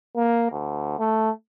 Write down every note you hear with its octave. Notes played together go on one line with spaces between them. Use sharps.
A#3
D2
A3